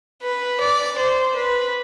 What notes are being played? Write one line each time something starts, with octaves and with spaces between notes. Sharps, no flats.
B4
D5
C5
B4